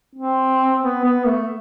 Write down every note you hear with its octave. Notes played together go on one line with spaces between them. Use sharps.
C4
B3
B3
A3